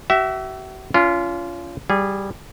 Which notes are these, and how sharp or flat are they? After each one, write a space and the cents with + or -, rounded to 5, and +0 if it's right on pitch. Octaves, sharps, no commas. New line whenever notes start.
F#4 +45 E5 +0
C#4 +35 F4 -20
G3 +0 G#4 -20